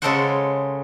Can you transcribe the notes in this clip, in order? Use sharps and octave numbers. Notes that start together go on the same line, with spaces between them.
C#3 G#3 A4 A#4 C5 F#5